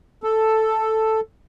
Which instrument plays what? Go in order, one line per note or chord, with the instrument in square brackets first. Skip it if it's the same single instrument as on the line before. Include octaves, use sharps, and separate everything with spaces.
[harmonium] A4